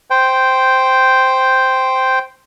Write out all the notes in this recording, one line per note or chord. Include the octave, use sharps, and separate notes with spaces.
C5 G5